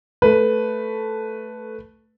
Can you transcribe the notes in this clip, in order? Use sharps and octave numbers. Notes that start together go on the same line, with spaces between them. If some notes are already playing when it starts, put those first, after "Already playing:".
A3 B4